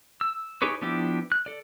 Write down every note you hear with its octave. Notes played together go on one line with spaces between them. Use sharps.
E6
D#4 G4 G#4 B4 C#5
F3 B3 D4 E4 G4
F#6
A4 D5